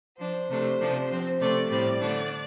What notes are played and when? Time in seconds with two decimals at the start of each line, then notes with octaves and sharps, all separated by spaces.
0.18 F3 D4 C5
0.49 C3 A3 D4
0.79 C3 F3 D4
1.09 F3 C4
1.39 C3 A3 C4 D5
1.69 A2 G3 C4 D5
2.00 D3 A3 D4